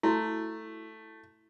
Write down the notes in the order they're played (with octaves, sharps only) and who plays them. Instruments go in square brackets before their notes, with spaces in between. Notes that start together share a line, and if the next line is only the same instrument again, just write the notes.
[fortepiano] A3 [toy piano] E4 F#4